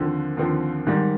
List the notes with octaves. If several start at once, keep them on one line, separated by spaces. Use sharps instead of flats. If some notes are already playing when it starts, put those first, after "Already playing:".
Already playing: D#2 D3 F3 C4
D#2 D3 F3 C4
G#2 D#3 G3